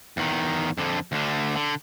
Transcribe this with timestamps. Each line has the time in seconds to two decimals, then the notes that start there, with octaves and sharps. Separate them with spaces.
0.17 E2 D#3
0.78 F2 D3
1.12 D2 D3
1.56 D3